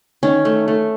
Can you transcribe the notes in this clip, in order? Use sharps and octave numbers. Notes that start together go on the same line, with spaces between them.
D#3 C#4
A3
A3